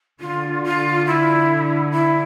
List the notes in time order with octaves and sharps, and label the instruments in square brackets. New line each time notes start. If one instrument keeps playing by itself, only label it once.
[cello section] D3 [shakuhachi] F4
[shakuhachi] F4
E4
E4